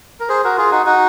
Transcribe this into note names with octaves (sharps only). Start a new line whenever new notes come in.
A#4
G#4 C5
F#4 A#4
F4 G#4
D#4 F#4
D#4 F#4